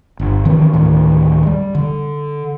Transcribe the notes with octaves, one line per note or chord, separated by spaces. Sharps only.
G1
D#3 E3 C4
D2 A2 D#3
G3
D3